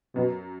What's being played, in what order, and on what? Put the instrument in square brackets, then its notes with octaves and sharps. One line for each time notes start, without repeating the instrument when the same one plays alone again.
[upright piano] F#2 [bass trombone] B2